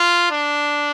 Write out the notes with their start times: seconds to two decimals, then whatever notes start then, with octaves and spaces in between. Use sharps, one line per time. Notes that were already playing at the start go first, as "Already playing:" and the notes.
Already playing: F4
0.31 D4